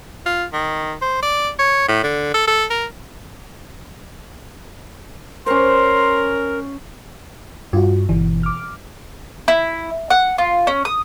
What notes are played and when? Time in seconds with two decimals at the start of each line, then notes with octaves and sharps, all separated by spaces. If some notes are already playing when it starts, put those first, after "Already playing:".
0.26 F4
0.53 D#3
1.02 C5
1.23 D5
1.59 C#5
1.88 A2
2.03 D3
2.34 A4
2.48 A4
2.70 A#4
5.46 C#4 A#4 C5 C6
7.73 G2 F4 F#4
8.09 G1 B2 E3
8.43 D6 F6
9.48 E4
10.10 F#5
10.38 F4
10.67 C#4
10.85 D#6